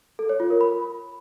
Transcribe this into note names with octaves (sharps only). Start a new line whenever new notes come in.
A4
C#5
F4
A#4
B5